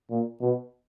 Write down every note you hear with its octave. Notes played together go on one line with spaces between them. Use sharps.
A#2
B2